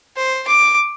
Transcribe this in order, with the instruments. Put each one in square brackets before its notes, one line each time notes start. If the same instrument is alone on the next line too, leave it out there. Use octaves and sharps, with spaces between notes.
[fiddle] C5
D6